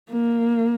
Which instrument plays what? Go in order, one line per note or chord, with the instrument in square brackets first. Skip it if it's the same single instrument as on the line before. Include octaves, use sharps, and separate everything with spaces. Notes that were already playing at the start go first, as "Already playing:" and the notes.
[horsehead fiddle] A#3